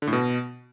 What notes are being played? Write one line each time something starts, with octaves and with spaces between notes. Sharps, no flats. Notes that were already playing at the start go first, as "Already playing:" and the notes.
D3
A2
B2